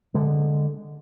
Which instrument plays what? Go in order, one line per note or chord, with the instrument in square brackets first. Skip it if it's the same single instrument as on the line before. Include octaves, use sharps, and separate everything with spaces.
[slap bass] D3 G#3